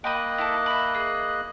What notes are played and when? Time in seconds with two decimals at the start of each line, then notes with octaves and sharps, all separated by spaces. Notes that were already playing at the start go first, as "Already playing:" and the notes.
0.04 A#3 D#5 G5 B5 D#6 F#6
0.38 E4 A4
0.66 E5 B5
0.95 G#4